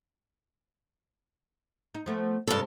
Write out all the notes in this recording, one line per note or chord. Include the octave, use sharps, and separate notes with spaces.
D#4
F3 A3 B3
G2 C3 G#3 A4